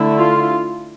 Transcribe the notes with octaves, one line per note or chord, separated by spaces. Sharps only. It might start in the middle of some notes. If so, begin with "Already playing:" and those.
Already playing: D3 A3 E4
F4